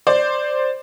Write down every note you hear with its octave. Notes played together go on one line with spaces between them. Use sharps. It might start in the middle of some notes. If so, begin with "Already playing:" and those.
C5 D5